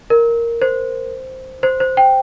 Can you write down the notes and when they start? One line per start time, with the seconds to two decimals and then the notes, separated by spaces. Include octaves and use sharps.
0.10 A#4
0.62 C5
1.63 C5
1.80 C5
1.97 G5